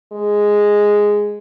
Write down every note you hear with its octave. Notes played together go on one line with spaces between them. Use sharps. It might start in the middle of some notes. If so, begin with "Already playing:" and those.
G#3